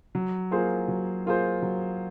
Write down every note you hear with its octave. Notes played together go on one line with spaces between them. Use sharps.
F#3
A#3 F4 G#4 C5
F#3
A#3 F4 G#4 C5
F#3